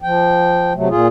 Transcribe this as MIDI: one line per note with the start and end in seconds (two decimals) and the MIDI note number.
0.02 0.73 53
0.02 0.73 79
0.75 0.88 48
0.75 0.88 54
0.75 0.88 57
0.89 1.08 46
0.89 1.08 65
0.89 1.08 68